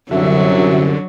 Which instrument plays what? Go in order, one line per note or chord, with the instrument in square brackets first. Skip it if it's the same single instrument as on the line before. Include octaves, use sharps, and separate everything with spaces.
[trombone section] C2 F#2 [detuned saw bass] D3 [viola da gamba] F#3 [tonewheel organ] F#4 E5